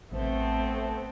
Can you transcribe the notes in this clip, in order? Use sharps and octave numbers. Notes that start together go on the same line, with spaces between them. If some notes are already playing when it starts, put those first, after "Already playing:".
A1 A3 B3 C4 C5